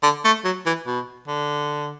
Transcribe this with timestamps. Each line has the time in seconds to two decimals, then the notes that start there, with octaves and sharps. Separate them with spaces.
0.03 D3
0.25 A3
0.45 F#3
0.66 E3
0.87 B2
1.28 D3